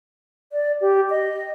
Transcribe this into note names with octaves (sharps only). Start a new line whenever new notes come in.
D5
G4
D#5